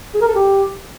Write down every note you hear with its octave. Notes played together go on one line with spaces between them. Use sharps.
G#4
A#4
A4
G4